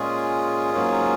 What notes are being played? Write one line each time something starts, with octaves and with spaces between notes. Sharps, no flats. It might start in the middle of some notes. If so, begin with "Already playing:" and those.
Already playing: A#2 G#3 C#4 F4 G#4
G#2 F#3 A#3 C#4